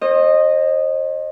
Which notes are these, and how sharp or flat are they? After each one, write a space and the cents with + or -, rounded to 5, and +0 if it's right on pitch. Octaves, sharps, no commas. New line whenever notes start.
C5 +40 D#5 -15